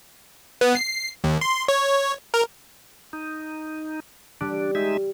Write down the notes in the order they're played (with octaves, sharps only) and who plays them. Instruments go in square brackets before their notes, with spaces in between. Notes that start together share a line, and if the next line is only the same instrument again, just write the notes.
[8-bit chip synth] B3
C7
D#2
C6
C#5
A#4
[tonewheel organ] D#4
[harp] G3 [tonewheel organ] D4
[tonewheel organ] G#3 D#4 E5